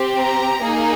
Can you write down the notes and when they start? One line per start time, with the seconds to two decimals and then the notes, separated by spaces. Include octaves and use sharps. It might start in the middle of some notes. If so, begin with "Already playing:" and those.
Already playing: C4 G4
0.20 A#5
0.62 A#3 D#4 G#4